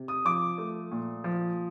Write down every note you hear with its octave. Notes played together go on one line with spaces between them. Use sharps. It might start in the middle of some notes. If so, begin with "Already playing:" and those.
Already playing: C3
D#6
F3 D6
A3
A#2
F3